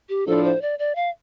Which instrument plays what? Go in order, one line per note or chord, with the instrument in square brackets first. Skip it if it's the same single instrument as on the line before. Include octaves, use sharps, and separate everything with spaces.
[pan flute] G4
[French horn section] A2 F3 D4 [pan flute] A4
[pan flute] C5
D5
D5
F5